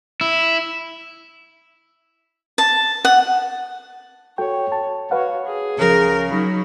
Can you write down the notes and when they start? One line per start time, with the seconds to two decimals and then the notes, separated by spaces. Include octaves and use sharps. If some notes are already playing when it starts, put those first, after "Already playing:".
0.21 E4
2.58 A5
3.05 F#5
4.38 F#4 A4 C#5 G5
4.72 A5
5.11 F#4 B4 C#5 F5 F#5
5.46 G#4
5.79 C#2 C#3 F3 A#4
6.29 F#3 D#4 B5